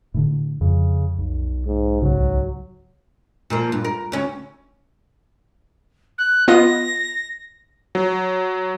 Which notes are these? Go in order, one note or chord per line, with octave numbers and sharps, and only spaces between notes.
A2 D3
F2 C#3
B1
G#2
C#2 G#2 C#3 F#3
A#2 F3 A#3
G2
A#4
D2 C#4
F#6
B3 F4 D#5 A#6
F#3